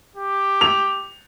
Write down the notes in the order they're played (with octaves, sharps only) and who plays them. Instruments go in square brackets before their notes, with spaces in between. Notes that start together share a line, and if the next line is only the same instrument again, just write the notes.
[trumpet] G4
[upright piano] F7